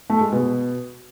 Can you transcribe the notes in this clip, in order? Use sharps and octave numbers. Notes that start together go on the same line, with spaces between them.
A3
G#3
B2